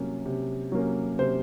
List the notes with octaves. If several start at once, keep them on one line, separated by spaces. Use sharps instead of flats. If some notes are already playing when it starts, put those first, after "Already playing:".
Already playing: C3 F#3 A#3 C#4
C3
F#3 A#3 C#4
C3 C5